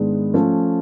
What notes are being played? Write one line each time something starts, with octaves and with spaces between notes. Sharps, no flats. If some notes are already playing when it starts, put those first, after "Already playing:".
Already playing: G#2 D#3 G#3 B3 D4
F3 A3 C#4